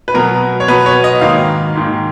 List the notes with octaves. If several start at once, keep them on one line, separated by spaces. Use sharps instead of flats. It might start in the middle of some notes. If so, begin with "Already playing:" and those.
B4
B2 F#3 B3 A#4
C#5
B2 F#3 B3 B4
C#5
D#5
G#2 D#3 A#3 F5
G#2 D#3 A#3